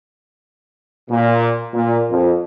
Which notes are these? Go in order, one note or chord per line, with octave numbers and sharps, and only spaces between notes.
A#2
A#2
F2